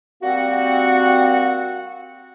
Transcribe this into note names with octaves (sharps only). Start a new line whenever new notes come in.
G3 A#3 C4 F#4 F#5